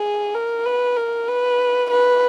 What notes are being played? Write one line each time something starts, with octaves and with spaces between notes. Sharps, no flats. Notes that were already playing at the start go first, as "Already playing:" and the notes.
Already playing: G#4
A#4
B4
A#4
B4
B4